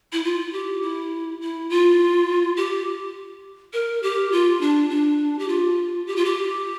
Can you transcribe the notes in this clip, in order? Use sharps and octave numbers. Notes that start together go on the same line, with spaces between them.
E4
F4
G4
E4
E4
F4
G4
A#4
G4
F4
D4
D4
G4
F4
G4
F4
G4